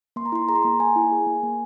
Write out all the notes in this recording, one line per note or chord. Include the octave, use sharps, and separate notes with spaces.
A#3 C6
A#5
E4 C6
G#4 A#5
C6
A#3 A#5
A#3 G#5
E4
G#4
A#3
A#3